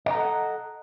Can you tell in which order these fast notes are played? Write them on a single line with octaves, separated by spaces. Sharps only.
D#5 A#5 A4 F#5